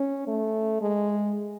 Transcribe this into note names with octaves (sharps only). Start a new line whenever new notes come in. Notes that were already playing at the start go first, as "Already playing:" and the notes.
Already playing: C#4
A3
G#3